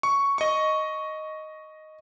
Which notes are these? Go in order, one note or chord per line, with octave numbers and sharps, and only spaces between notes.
C#6
D#5 C#6